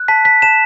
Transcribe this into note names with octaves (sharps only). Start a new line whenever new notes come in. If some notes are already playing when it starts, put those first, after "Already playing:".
Already playing: F#6
A5 B6
B6
A5 E7